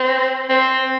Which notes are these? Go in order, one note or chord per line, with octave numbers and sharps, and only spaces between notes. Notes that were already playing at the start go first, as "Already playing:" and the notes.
Already playing: C4
C4